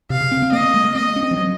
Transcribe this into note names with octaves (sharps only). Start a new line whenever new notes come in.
C3 F5
C#3
C4
C4
A#3 D#5
G#3
A#3
C4 D#5
C#4
C4
F3
F#3